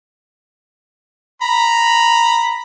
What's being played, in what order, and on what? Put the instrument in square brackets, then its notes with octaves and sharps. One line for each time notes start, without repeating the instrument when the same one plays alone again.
[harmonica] A#5 B5